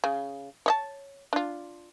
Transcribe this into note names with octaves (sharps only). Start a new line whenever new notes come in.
C#3
C#5 D#5 A5
D4 F4